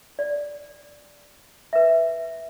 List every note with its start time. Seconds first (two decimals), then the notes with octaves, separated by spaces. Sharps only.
0.19 D5
1.73 B4 E5